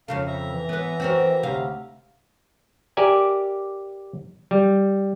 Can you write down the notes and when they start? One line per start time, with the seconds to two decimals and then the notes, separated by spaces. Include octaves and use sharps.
0.08 F2 C#3 A4 F5
0.27 E5 A#5
0.50 E3
0.69 B3 B4
1.00 C4 F#4 A#4
1.43 D2 C3 F5
2.97 G4 A#4 D5 E5 G#5
4.51 G3